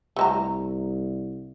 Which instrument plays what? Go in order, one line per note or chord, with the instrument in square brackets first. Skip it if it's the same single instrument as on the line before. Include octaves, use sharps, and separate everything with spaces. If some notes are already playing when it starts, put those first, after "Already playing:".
[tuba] C2 [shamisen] A3 C5 A#5